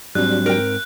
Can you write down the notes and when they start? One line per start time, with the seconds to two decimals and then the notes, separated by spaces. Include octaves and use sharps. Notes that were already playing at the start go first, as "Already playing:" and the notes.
0.15 G#2 F#3 G3 C4 D4 F#6
0.46 A#4 G5